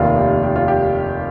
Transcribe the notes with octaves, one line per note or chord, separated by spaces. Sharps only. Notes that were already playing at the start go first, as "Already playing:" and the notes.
Already playing: F1 D#2 D#3 F4
G4
G4
F4
G4